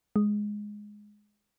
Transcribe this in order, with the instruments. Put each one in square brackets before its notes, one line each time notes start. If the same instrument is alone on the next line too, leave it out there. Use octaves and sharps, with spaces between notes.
[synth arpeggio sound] G#3